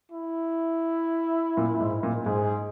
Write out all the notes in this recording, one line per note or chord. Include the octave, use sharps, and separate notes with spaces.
E4
A#2
G#2
A#2
G#2 G#4